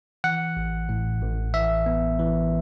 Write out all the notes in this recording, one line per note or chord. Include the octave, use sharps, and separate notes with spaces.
E3 F#5
A1
A2
A1
E3 E5
B3
E3